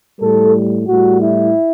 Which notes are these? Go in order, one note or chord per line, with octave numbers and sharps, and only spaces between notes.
A2 G3 A4
A2 G3 F#4
E4